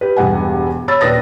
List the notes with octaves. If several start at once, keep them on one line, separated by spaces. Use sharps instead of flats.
G4 B4
E1 G2 F#5 G#5
C#5 B5 E6 A6
D#1 D4 B4 D#6 A#6